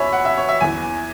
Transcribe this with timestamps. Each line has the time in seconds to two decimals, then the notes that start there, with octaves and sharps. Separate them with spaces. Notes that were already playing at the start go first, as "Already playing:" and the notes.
Already playing: E2 B2 C#5 E5 G#5 B5
0.13 F#5
0.25 E5
0.37 C#5
0.49 E5
0.61 E2 E3 G#5